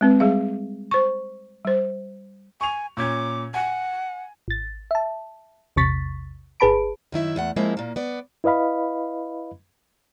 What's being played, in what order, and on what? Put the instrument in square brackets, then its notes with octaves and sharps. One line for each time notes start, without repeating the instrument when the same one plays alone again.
[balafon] G#3 C4 B4
G3 G#4 F5
C5 C#6
G3 C5
[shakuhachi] G#5 [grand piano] C#6 F7
[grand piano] A#2 C#4 G#6 [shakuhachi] D6
[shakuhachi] F#5 [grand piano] G#5
[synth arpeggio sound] G#1 A6
E5 A5
A#1 E2 C3 C#6 A6 B6
G1 G#4 B4 A5 B5 D7
[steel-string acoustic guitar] F#2 D#3 E4 E5
E2 A3 F#5
F3 G#3 A#3 C4 E4
A#2 A#3
B3 D5
[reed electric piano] E4 B4 D#5 F5 B5